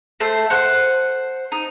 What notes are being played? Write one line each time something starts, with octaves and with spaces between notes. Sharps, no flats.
A3 C5
C5 F#5
D#4